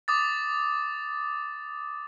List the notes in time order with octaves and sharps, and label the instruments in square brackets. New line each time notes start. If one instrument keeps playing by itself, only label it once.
[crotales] D6 D#6 A6